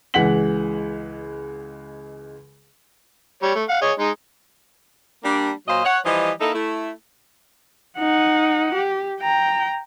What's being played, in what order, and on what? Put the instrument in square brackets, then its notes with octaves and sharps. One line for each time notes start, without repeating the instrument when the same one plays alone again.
[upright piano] C#2 E3 G#3 F#5 B6 F#7
[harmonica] G3 C#5
A3
F5 F#5
G#4 C#5 D#5
G#3 D#4
[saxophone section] G3 A#3 D4
A#2 F#3 C5 D#5 F5
C#5 F#5
E3 F3 G3 D#5
A#3 D#4 E4 A4
A3 E4
[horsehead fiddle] D#4 F#5
G4
G5 A#5